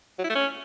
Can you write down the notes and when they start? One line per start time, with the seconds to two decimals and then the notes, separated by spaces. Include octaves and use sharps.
0.19 F#3
0.24 E4
0.30 A3
0.35 C#4